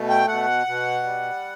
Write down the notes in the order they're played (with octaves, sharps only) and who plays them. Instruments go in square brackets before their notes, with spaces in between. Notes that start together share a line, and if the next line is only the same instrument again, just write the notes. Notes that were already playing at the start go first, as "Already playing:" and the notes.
Already playing: [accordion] B2 A3
G5
B2 F#5
B2
G3